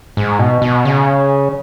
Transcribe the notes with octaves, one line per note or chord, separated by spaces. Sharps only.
G#2
B2
B2
C#3